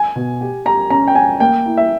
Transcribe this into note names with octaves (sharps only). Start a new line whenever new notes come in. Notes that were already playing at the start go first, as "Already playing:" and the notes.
Already playing: G#5
B2
G4
G4 A#5
C#4 A#5
G5
C#4 G#5
A#3 G5
E4
E5